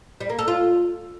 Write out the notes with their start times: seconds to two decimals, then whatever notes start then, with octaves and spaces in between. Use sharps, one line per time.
0.20 G3
0.30 A#3
0.39 A4
0.48 F4